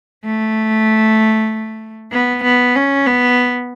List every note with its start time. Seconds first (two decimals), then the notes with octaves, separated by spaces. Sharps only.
0.25 A3
2.12 B3
2.44 B3
2.75 C#4
3.07 B3